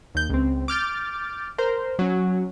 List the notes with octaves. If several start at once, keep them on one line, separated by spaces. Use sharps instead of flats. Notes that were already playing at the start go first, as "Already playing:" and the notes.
D#2 G6
C#2 C4
D6 F6 G6 A6
A#4 C5
F#3 C#4